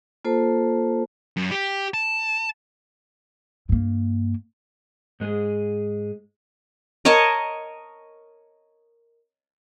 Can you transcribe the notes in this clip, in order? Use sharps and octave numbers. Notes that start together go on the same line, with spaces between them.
A#3 F4 A4 C5 A5
F#2
G4
A5
G2 A#3
G#2 G#3 G#4
A#4 C#5 D#5 A5